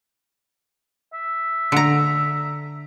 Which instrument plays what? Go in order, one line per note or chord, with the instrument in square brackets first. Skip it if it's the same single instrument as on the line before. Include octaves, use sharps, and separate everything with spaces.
[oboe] E5
[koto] D3 A#5